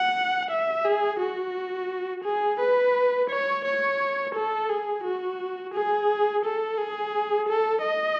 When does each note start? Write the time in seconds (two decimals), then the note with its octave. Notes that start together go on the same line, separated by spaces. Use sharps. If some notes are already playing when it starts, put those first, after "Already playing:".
Already playing: F#5
0.50 E5
0.85 G#4
1.19 F#4
2.24 G#4
2.60 B4
3.30 C#5
3.64 C#5
4.35 A4
4.69 G#4
5.04 F#4
5.73 G#4
6.44 A4
6.78 G#4
7.48 A4
7.83 D#5